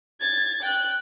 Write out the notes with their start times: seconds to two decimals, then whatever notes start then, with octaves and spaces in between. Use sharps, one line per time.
0.21 G#6 A6
0.62 G5 F#6